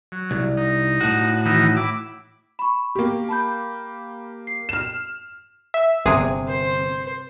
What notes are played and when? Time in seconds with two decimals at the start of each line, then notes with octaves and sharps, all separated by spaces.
0.12 F#3
0.31 C2
0.57 D#4
1.01 A2 F#4
1.46 D#3 E3 D#4
1.77 E4 D6
2.59 B5 C#6
2.95 A#3 G4
3.29 A5 B5 G6
4.47 C7
4.69 F6 E7
5.74 E5
6.06 G1 C3 G#4
6.48 C5